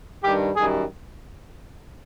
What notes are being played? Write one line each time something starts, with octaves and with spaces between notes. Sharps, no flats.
G2 D#3 G3 G4
F#2 D#3 G3 G#4